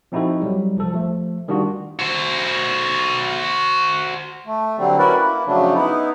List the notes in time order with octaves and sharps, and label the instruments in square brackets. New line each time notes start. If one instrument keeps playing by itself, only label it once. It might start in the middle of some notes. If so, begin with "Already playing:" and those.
[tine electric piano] F3 C4 D#4 E4 F#4 A4
F#3 G3
C2 F3 A4
F3 A3
D#3 G3 D4 F4 F#4
[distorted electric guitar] F#4 C5
[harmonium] A3
D3 F#3 G3 C4
C#4 E4 F#4 A#4 B4 D5
A#3 E4
F#2 C#3 F3 F#3 A3 D4
B3 D#4 E4